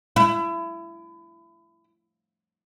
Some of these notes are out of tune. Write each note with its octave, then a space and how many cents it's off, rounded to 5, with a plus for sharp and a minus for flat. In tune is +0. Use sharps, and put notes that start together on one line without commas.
E4 +30